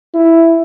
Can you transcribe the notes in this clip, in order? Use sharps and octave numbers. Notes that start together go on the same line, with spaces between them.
E4